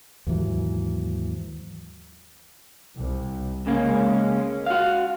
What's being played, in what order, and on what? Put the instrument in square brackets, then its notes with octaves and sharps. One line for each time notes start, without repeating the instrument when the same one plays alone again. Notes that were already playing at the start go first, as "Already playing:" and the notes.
[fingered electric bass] D#2 G#2 E3 F#3
[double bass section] C2
[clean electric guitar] C#3 A#3 [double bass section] G#3 C#4
[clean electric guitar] F#4 F5